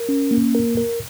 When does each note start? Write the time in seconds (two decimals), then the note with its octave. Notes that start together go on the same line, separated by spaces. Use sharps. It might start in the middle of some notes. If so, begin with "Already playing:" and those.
Already playing: A#4
0.09 C#4
0.31 A#3
0.55 A#4
0.77 A#4